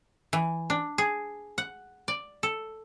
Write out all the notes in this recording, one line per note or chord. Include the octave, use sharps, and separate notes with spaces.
E3
D4
G#4
F#5
D5
A4